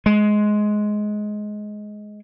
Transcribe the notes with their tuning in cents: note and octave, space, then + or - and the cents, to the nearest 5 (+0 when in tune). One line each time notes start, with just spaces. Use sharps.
G#3 +15